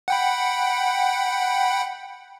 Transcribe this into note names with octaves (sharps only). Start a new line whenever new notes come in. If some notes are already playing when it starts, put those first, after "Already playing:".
F#5 G5 B5